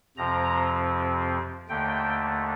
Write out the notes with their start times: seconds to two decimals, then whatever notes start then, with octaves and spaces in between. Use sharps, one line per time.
0.17 F2 C3 F3 C4 A#5
1.69 D#2 D3 A3 G5